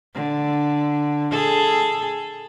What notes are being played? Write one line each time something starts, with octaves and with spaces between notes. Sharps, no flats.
D3
G#4 A4